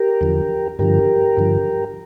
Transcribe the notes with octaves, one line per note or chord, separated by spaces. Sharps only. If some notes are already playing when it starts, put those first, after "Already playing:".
Already playing: G4 A#4
E2 D3 F3
G2 D3 F3 G4 A#4
G2 D3 F3